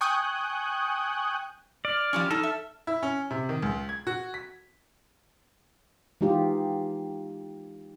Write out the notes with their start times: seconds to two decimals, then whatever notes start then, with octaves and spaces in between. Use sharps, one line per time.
0.01 G5 G#5 C#6 D#6 F#6 G6
1.85 D5 F6
2.13 F3 G3 C#4
2.31 D#4 A4
2.43 E5
2.87 E4
3.03 C#4
3.31 C3
3.49 D#3
3.62 C#2
3.89 G#6
4.07 F#4
4.34 B6
6.21 E3 G#3 D#4 F4 G4